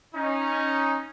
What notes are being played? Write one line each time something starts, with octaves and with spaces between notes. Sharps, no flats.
C#4 D#4